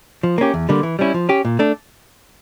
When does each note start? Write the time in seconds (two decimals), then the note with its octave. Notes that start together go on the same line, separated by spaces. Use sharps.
0.23 F3
0.38 A#3 C#4 G4
0.54 E2
0.69 D3 G3 A#3
0.83 E3
0.99 G3 C#4 E4
1.14 F3
1.29 C#4 G4
1.45 A#2
1.59 A3 D4